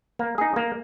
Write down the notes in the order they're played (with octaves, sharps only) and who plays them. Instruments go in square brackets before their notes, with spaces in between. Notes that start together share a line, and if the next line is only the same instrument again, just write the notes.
[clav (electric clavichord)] A#3
D#4 G#4
A#3